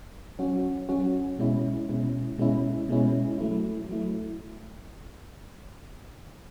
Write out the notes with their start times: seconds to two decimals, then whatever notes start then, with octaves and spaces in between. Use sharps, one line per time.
0.39 F#3 C#4 F#4
0.89 F#3 C#4 F#4
1.39 B2 G#3 C#4 E4
1.89 B2 G#3 C#4 E4
2.38 B2 G#3 C#4 E4
2.89 B2 G#3 C#4 E4
3.38 F#3 A3 E4
3.89 F#3 A3 E4